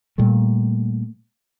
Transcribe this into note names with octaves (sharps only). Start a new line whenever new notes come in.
A#2 G3 A3